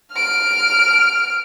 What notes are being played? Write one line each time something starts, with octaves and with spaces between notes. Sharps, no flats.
F6 D7